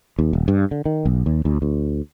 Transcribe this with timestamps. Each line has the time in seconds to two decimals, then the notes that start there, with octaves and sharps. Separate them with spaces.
0.19 D#2
0.33 D#1
0.48 G2
0.71 D3
0.86 D#3
1.06 B1
1.26 D#2
1.45 D2
1.62 D2